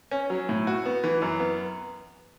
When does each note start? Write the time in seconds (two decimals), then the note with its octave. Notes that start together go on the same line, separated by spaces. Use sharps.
0.11 C#4
0.30 F#3
0.49 A2
0.67 F#4
0.86 B3
1.04 E3
1.22 F#2
1.40 B3